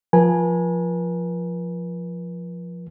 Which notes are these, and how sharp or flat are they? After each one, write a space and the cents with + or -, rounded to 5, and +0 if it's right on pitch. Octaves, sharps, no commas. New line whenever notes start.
F3 +0 B4 -45 G#5 +0